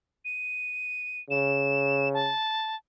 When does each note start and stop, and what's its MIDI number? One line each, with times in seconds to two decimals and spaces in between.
0.25 1.20 99
1.30 2.32 49
1.30 2.08 100
2.14 2.76 81